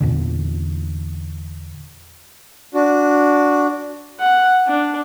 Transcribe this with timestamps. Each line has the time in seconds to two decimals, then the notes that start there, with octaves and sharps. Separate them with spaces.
0.01 E2 A#2 D3
2.74 D4 F#4
4.20 F#5
4.66 D4